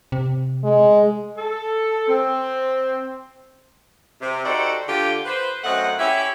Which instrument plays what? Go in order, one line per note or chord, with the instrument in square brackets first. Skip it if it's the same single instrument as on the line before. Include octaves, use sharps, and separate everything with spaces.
[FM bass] C3
[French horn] G#3
[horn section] A4
C4
[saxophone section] C3
D#4 F#4 G4 A4 C5 D5
D3 F4 G4
B4 C5
F#2 A3 C4 D#5 F#5
C#4 E4 G4 C#5 E5